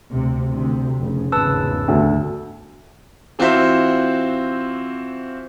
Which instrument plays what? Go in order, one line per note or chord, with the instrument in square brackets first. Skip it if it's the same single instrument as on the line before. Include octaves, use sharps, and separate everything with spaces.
[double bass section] D2 C3
D2 C3
F1 C#3
[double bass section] G#1 E2 C#3 [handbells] B4 A5 E6
[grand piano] D2
E3 C4 F4 F#4 C5 E5